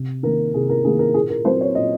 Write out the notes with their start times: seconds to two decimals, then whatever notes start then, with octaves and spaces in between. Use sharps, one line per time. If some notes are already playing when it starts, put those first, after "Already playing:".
Already playing: C3
0.23 D#3 A#3 A#4
0.54 C3 G#4
0.69 A#4
0.85 D#3 A#3 G#4
0.99 A#4
1.14 A#2 G#4
1.30 A#4
1.44 F#3 C4 C5
1.61 C#5
1.75 A#2 D#5